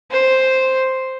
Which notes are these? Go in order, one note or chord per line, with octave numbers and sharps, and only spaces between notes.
C5